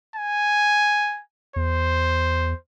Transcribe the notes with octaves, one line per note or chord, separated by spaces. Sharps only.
G#5
E2 C5